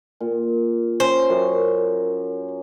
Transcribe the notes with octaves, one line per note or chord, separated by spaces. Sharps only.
A#2
C#4 C5
F#2